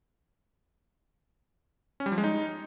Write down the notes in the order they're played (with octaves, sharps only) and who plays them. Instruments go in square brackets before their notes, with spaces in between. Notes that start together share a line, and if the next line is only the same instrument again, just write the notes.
[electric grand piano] C#4
G3
F3
G#3
D#4